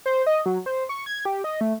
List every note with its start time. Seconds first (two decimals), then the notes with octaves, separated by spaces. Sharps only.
0.06 C5
0.27 D#5
0.46 F#3
0.66 C5
0.89 C#6
1.06 G#6
1.25 G4
1.44 D#5
1.61 A3